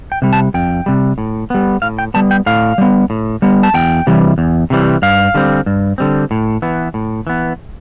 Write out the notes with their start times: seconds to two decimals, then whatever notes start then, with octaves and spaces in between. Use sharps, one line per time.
0.12 G5
0.22 C3 G3
0.33 A5
0.54 F2 G5
0.86 C3 G3
1.18 A2
1.50 G3 B3
1.82 A2 F5
1.99 G5
2.14 G3 B3 A5
2.31 G5
2.46 A2 F5
2.78 G3 B3
3.10 A2
3.42 G3 B3
3.63 A5
3.74 E2 G5
4.07 C3 E3 G3
4.38 E2
4.70 C3 E3 G3
5.02 G2 F5
5.34 D3 G3 C4
5.66 G2
5.98 D3 G3 C4
6.31 A2
6.62 E3 B3
6.94 A2
7.27 E3 B3